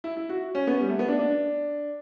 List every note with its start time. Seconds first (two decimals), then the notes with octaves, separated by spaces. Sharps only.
0.04 E4
0.17 E4
0.29 F#4
0.55 C#4
0.67 B3
0.81 G3
0.89 A3
0.99 B3
1.08 D4
1.19 D4